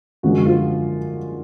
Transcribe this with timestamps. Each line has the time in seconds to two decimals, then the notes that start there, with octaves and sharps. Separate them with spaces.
0.23 F#2 D3 F3 G#3 F#4
0.46 F4